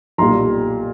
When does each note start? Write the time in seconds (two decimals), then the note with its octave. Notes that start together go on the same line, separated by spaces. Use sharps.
0.18 B1 A#2 G3 A#5 C6